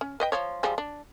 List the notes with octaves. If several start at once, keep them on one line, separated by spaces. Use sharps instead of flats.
C#4
B4 D#5 G5
F3 C#5
F3 G3 G#3
D4